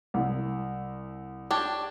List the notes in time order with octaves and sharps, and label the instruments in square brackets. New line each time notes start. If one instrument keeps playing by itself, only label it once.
[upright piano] C2
[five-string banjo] D4 G4 C#5